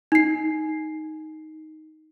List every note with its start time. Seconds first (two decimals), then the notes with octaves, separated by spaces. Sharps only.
0.12 D#4 C7